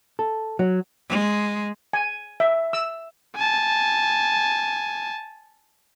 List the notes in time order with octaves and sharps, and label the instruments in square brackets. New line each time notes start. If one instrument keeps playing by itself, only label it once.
[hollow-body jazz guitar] A4
F#3
[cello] G#3
[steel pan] G#5
E5
E6
[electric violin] G#5 A5